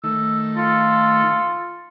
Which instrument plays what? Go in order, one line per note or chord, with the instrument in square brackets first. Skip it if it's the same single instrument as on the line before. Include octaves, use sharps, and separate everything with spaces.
[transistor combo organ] D#3 A3 [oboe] E6
[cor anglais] F4 [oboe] A4